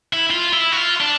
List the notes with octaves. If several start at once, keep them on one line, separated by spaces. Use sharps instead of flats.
E4
F4
E4
F#4
F4
D4